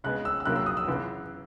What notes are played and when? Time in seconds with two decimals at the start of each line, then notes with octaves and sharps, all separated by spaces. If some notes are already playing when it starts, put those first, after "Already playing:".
0.04 C#3 G#3 B3 F#6
0.25 E6
0.40 E6
0.45 F#2 C#3 F#3 A#3 F#6
0.56 E6
0.66 D#6
0.77 E6
0.87 F#2 C#3 E3 B3